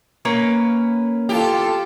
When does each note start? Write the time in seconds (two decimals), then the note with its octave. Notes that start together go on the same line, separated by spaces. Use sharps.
0.25 A#3 C#4 B4
1.29 F4 G4 A4